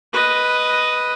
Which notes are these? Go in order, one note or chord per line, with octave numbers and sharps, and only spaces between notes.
B4 D#5